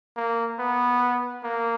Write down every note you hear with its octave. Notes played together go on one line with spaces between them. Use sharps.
A#3
B3
A#3